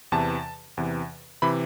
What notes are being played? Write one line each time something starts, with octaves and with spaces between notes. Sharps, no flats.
E2 C3 E3 A5
E2 C3 E3
C3 E3 B5